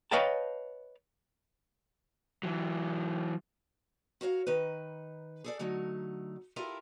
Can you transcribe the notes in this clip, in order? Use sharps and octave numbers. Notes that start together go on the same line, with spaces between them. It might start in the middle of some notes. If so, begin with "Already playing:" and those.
B4 C#5 D#5 F5 G5 A5
E3 F#3
F#4 A#4 C#5 F5
D#3 D#4 B4
G#4 A4 D5
D3 F#3 A3 D#4
E4 F4 G4 A4 A#4 E5